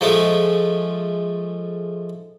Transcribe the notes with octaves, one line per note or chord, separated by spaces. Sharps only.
F3 G#3 A3